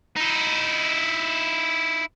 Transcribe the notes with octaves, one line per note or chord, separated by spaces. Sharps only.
D#4 E4